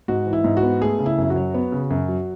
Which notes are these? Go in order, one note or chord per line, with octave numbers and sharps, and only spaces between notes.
G#2 F#4
E3
E4
G#2
F#4
B3
A3 G#4
C#3
E4
F#2
F#4
F#3
B3
C#3
F#2
F#3